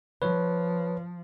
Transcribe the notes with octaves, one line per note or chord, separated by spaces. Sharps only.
F3 B4 C#5